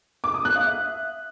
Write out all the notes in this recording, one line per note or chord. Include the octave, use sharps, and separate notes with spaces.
D6
D#6
F#6
F5
E5